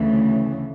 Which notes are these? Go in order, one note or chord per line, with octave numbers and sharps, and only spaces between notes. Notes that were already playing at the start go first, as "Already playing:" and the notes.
Already playing: D2 C#3 E3 A3